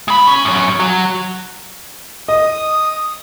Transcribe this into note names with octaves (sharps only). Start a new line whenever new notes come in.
G#3 B5
C#4
F#2 C#4
F#3
D#5 D#6